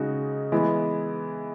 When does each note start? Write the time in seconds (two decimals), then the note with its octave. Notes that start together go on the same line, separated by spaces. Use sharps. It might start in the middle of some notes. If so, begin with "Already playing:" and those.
Already playing: C#3 G#3 D#4 F#4
0.52 E3 G#3 B3